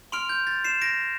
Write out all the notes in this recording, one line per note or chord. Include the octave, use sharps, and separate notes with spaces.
C6 F6 D7 F7
G6
A6
C7 E7
A#6 D7